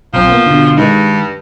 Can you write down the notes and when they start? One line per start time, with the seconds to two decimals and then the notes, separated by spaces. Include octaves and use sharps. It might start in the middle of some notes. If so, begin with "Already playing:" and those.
0.14 B1 F3 C4
0.29 A#3 B3
0.46 B2 D3
0.77 G2 D#3 G#3